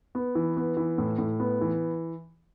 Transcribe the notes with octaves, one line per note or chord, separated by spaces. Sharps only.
B3
E3
B3
E3
A2
A2
B3
E3